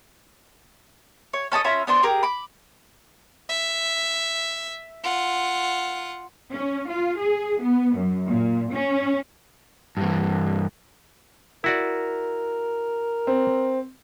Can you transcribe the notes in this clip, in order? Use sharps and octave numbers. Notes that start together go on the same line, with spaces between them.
C#5
C#4 A4 D#5 D#6
C#4 F4 E5 B5
B3 D4 C5 C6
G4 G#4 A#4
B5 D6
E5
F4 F#5
C#4
F4
G#4
B3
F#2
A#2
C#4
G2 E3
E4 F#4 A#4 D5
C4